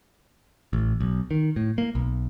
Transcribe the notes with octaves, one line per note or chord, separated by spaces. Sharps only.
A1
B1
D#3
A2
A#3
B1